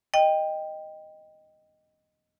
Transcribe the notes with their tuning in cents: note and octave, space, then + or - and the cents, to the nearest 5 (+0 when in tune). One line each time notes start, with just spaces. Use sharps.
D#5 +0 G5 +10